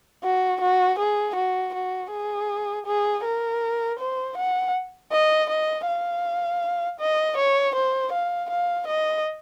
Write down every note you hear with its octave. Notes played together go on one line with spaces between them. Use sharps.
F#4
F#4
G#4
F#4
F#4
G#4
G#4
A#4
C5
F#5
D#5
D#5
F5
D#5
C#5
C5
F5
F5
D#5